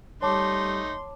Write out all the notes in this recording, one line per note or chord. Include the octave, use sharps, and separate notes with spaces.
G3 A3 D#4 C#5 A5 C6 D6